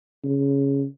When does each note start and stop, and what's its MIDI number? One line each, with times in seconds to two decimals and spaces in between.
0.24 0.85 49